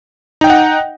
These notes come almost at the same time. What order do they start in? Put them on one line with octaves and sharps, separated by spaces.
D#4 G5 D#5 F#5